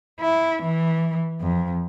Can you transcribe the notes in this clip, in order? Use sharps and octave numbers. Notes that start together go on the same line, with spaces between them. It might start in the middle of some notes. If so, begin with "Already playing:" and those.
E4
E3
F2